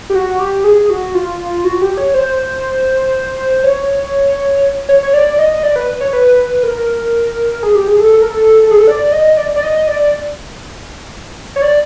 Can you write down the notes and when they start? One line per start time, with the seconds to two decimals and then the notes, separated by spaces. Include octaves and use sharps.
0.10 G4
0.15 F#4
0.39 G4
0.64 G#4
0.90 F#4
1.15 F4
1.65 F#4
1.81 G4
1.97 C#5
2.14 C5
3.64 C#5
4.89 C#5
5.03 C#5
5.14 D5
5.39 D#5
5.63 D5
5.76 B4
6.01 C#5
6.13 B4
6.63 A#4
7.63 G#4
7.75 G4
7.88 G#4
8.00 A4
8.13 A4
8.22 A#4
8.30 A4
8.63 A4
8.71 G#4
8.79 A4
8.88 D5
9.12 D#5
9.37 D5
9.56 D5
9.63 D#5
9.87 D5
11.56 C#5
11.62 D5